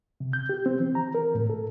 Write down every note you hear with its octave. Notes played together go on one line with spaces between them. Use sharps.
C3
G6
G4
C4
E3
A#5
A#4
A2
A4